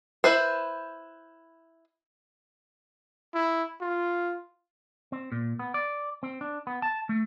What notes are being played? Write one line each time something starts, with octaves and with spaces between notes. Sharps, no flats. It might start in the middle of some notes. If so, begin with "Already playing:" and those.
E4 B4 C5
E4
F4
C4
A#2
B3
D5
C4
D4
B3
A5
A3